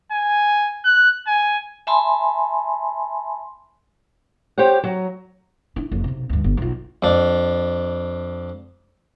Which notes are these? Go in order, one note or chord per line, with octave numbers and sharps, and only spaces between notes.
G#5
F#6
G#5
E5 G#5 A5 B5 C6
G4 C5 C#5 F#5
F#3
D4 E4
F#1 F2
B1 C3
D2 G2
G1
B1 F4
F2 D4